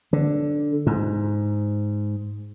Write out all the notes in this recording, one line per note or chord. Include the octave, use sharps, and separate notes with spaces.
D3
G#2